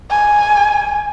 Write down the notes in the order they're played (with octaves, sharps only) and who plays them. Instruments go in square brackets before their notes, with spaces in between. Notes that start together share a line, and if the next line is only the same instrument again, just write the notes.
[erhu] G#5